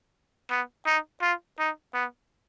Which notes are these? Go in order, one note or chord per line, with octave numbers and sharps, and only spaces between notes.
B3
D#4
F4
D#4
B3